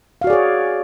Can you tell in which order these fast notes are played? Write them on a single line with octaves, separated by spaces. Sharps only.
F5 F#4 D5 G#4 C#5